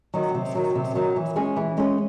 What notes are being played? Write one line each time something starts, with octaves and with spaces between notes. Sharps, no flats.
D#3 F#3
C3
D#3 F#3
C3
D#3 F#3
E3
G#3 C#4 G#4 C#5
E3
G#3 C#4 G#4 C#5